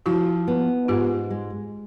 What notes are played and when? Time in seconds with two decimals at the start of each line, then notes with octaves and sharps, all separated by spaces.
0.06 F3 E4 F#4
0.48 B3
0.88 G#2 F4 G4
1.30 G#3